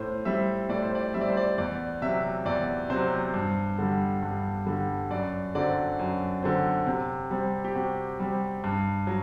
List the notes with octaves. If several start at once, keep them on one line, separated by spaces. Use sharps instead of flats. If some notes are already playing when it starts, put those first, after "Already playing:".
Already playing: A2 C5
G3 C4 E5
A2 D5
C5
D5
G3 C4 E5
D5
C5
D5
E2 D5
C3 F#3 E5
E2 D5
C3 F#3 C5
G2
D3 G3
G2
D3 G3
F#2 D5
D3 F#3 C4 D5
F#2
D3 F#3 C4
C3
G3 C4
G4
C3 F#4
G3 C4
G2
F#3